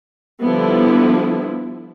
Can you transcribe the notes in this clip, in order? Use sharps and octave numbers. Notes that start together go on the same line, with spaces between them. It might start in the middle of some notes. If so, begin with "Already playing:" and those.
D3 F3 G3 B3 E4